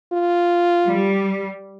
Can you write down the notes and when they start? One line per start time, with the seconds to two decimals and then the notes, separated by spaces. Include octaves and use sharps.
0.13 F4
0.88 G3